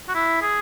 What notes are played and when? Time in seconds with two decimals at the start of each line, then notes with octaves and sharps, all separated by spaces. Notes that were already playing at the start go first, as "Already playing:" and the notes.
0.08 F#4
0.15 E4
0.42 G#4